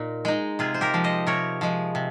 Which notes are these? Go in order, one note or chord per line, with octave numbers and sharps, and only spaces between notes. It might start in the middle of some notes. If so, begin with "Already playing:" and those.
Already playing: A#2 D#4
G#3 D#4
C3 F4 G#4
C5
G4 A#4
F3 G#3
C5 D#5
C3 A#4 C#5
F3 G#3
C3